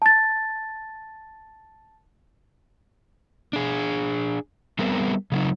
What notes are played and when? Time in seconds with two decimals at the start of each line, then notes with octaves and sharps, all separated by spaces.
0.02 A5 A6
3.53 D4 G#4
4.79 G3 B3 C4 G#4 A#4
5.32 C#3 F#3 D#4